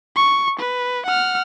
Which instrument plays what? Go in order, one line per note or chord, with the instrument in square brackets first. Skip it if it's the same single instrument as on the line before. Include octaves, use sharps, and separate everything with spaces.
[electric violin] C#6
B4
F#5 F6